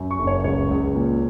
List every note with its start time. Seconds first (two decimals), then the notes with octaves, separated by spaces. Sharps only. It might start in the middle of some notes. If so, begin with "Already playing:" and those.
Already playing: F#2
0.11 C#6
0.19 F#1
0.27 C#5
0.44 C#2 C#5
0.70 C#2
0.95 A#2